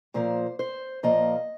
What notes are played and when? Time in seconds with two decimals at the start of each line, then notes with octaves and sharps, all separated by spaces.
0.14 A#2 F3 A#3 C5
0.59 C5
1.03 A#2 F3 A#3 D#5